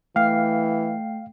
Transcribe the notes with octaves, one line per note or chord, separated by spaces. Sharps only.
E3 A3 F5 G5 C7